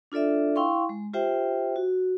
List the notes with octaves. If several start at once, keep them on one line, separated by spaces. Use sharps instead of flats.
D4 F4 A4 D5 E5
E4 F5 G5 C6 C#6
G#3
F4 G4 C5 E5 G5
F#4